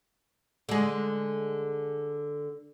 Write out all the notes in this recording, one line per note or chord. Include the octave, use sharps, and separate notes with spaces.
D3 G#3